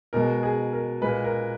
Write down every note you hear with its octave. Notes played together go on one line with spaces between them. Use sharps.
B2 G#3 A#4
G#4
A#4
A#2 G#3 B4
A#4